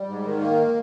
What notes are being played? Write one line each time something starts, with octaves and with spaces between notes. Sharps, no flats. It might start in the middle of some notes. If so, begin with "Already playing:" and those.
Already playing: G3
G#2
D#3
A#3